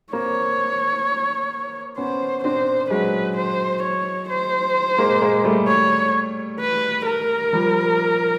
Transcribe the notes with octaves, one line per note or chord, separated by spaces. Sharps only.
A#3 C4 C#5
B3 C#4 C5
C4 D4 C5
F#3 G#3 B4
C5
C#5
C5
G#3 A#3
G#3 A#3
G3 A3
C#5
B4
A#4
F3 G3